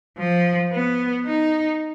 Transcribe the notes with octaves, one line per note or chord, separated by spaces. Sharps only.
F3
B3
D#4